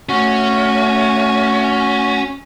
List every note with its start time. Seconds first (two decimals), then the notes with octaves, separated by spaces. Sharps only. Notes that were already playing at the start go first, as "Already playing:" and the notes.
0.09 A3 C#4 F#4